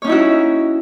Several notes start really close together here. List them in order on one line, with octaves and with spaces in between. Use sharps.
C#5 C#4 D#4 E4 F#4